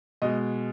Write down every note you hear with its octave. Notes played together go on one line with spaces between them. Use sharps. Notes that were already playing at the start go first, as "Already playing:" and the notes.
B2 G#3 D#5